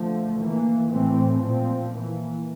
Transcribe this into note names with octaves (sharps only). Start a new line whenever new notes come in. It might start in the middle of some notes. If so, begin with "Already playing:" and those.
Already playing: D3 F3 A3
E3 A#3
A2 E3 A3 C4
A#2 F3 C4
E3 A#3